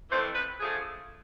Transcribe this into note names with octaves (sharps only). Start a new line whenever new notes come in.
F2 E3 A3 C4 C5
B4
D3 F3 A3 G#4